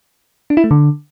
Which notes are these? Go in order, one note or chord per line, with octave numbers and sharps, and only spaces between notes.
D4
E4
A3
D3